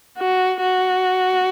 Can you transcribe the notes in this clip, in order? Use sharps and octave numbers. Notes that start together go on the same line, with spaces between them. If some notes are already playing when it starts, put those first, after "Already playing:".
F#4
F#4